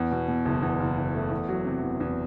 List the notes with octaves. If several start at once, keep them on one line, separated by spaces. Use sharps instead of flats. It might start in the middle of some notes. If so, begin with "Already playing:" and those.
Already playing: E2
B2
B2
F#1
E2
F#1
F#1
A3
E2
F#3
C3
E2
E2